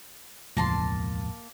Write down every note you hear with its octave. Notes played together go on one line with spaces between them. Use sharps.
E1 C#2 A2 F3 A#3 A5 C6